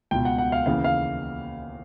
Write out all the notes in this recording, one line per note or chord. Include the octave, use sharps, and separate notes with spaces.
C#2 B2 G5
F#5
F#5
F5
D#2 C#3 E3 F5
F5